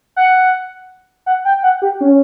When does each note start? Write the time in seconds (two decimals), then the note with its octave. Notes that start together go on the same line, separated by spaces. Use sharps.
0.16 F#5
1.26 F#5
1.45 G5
1.63 F#5
1.82 G4
2.01 C#4